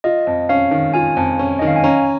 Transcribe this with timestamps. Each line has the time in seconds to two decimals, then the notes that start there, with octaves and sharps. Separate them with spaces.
0.04 F4 D#5
0.27 F2
0.49 C#4 F5
0.71 D#3
0.94 F4 G#5
1.17 F2
1.39 C#4
1.59 D#3 D#5
1.67 F5
1.76 G#5
1.84 C#4 A#5